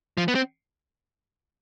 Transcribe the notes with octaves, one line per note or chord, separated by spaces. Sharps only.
F3
B3
C4